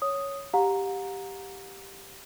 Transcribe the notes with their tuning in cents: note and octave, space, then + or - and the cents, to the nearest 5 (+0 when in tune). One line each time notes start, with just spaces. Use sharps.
C#5 +0 D#6 +0
G4 +0 F#5 -45 A#5 +0